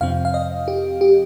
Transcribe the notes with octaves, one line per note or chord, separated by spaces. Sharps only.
F2 C3 F3 C4 F5
F5
D#5
G4
G4